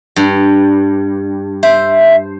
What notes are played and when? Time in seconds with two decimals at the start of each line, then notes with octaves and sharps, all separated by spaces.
0.16 G2
1.63 C5 E5